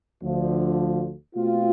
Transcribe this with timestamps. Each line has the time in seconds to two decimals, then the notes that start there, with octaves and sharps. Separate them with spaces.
0.22 D2 D3 F3
1.35 B2 A3 C4 F4